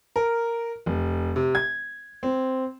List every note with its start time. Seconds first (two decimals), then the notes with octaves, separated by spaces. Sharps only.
0.16 A#4
0.86 F1
1.36 C3
1.55 G#6
2.23 C4